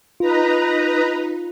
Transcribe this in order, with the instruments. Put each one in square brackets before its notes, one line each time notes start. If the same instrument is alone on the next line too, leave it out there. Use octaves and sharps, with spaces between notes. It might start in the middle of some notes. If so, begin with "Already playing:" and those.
[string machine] D#4 B4 A#5 [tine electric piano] F4